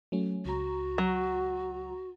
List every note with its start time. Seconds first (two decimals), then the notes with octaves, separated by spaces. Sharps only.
0.12 F#3 A3 C#4
0.45 C#2 F#4 A#5
0.98 F#3